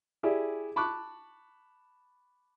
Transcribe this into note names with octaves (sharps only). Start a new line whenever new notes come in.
E4 G4 G#4 D5
A5 B5 C#6 D6 F#6